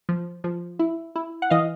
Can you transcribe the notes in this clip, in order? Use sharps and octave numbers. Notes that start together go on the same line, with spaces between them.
F3
F3
E4
E4
F#5
E3 D#5 F5